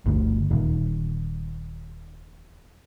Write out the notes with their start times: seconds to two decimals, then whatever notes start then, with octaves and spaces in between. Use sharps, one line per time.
0.06 G1 D2
0.51 D#1